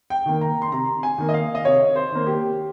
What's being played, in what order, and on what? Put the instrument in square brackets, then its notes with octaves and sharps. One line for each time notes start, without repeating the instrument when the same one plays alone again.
[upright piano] G5
D#3 A#3
A#5
C6
C3 A#5
G#5
D#3 A#3
D#5
F5
D#5
C3 C#5
C5
D#3 A#3
G4